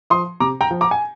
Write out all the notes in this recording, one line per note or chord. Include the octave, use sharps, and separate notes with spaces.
F3 C6 D#6
C3 A#5 D6
G5 A#5
F3
A#5 D6
G#5